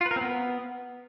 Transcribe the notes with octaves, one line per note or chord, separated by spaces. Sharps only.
F4
B4
A#4
C4
B3